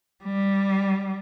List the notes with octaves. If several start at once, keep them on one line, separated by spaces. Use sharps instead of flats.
G3